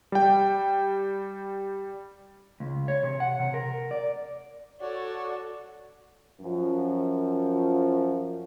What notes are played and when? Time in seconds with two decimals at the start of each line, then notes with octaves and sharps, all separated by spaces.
0.12 G3 G5
2.60 C#2
2.88 C#5
3.03 C3
3.20 F#5
3.40 C3
3.54 A#4
3.91 D5
4.80 F#4 A4 C#5 D5
6.41 F#2 F3